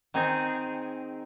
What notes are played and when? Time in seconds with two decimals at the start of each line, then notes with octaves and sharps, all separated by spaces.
0.14 D#3 C4 D#4 G#4